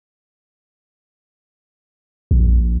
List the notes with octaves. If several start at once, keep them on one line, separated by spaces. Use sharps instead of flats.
A#1